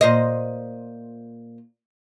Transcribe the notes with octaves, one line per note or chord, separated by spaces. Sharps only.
A#2 C5 D#5